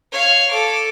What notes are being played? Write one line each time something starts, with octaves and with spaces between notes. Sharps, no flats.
C#5 F5
A4 D6